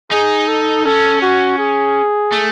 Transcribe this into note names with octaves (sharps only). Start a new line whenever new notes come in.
D#4 G#4
A4
C#4 A4
F#4
G#4
A3